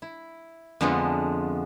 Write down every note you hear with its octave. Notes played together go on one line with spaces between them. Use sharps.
E4
F2 D3 F3 G#3 A3 B3